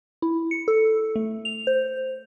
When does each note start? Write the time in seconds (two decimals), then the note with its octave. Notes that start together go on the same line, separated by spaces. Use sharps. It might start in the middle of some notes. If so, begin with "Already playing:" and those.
0.22 E4
0.51 C#7
0.68 A4
1.16 A3
1.45 F7
1.67 C5